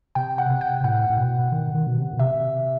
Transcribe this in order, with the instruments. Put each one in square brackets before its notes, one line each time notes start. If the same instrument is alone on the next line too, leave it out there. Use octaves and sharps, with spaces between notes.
[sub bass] C3 [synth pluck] G5
[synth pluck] F#5
[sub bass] C3
[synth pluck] G5
[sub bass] A2 [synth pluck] F#5
[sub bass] A2
B2
D#3
D#3
B2
C3
B2
[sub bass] C3 [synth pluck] E5